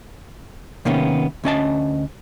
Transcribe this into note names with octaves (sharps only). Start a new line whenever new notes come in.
C3 D#3 A#3 B3 C#4
D2 C#4 D#5 A5